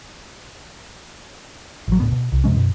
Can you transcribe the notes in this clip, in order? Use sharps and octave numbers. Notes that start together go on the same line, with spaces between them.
A1 F#3
D1 A2 B3
B2
C2
F2 C3 G#3 C#4
F#2 B2